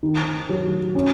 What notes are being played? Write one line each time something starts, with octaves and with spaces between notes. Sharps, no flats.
D#3
F#3
C#4